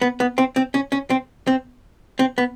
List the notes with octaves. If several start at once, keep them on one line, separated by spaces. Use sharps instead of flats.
B3
B3
C4
C4
C#4
C#4
C4
C4
C4
B3